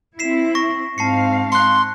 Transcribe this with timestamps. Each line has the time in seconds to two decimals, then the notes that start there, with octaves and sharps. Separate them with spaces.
0.19 C4 E4 B6 C7 E7
0.55 C#6 A#6
0.98 G#2 C4 F5 A5 C7 C#7
1.52 C6 F#6 C#7